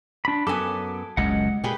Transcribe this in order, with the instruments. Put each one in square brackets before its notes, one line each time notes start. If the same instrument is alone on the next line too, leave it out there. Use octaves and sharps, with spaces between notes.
[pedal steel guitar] D4 B5
[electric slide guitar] F#2 F#3 B3 [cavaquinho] A4 G#5 [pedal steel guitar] D6
[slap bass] F#1 C#2 F#2 [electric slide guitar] G#3 D#5 F#5
[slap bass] A#2 [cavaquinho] G4 G#4 B4